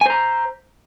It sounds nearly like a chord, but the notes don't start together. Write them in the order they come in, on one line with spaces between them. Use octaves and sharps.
G#5 C5 A#5